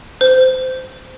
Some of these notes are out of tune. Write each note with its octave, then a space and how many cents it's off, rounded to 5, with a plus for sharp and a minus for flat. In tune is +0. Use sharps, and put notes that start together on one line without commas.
C5 -20